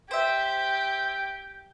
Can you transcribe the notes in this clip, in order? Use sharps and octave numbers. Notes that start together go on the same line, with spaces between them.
G4 C5 E5 G6